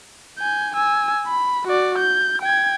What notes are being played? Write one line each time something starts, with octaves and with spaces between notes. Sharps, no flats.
G#5 G6
G#5 E6
B5
F#4 D5
G6
G5 G#6